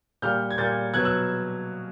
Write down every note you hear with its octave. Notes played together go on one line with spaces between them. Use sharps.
A#2 G3 A#3 F6 G6
G#6
A#2 G3 A#3 G6 A6
B2 F#3 B3 F#6 G#6
E6 F#6